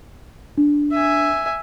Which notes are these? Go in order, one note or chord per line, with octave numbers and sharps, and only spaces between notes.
D4
E5 G#5